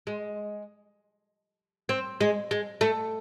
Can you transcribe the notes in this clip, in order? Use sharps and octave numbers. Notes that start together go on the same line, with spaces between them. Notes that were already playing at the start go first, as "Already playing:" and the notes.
G#3
C4
G#3
G#3
A3